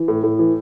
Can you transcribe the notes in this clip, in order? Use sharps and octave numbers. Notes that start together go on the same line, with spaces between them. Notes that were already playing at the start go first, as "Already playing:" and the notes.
Already playing: E3
A2
A2
E3